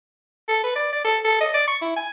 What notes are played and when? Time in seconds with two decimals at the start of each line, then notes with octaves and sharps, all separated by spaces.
0.48 A4
0.64 B4
0.76 D5
0.93 D5
1.04 A4
1.25 A4
1.41 D#5
1.54 D5
1.68 C#6
1.82 E4
1.97 G#5